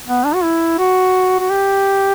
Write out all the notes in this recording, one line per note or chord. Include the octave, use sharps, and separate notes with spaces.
B3
D4
F#4
E4
F#4
F#4
G4